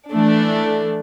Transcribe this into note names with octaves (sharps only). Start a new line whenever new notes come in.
E3 A3 D4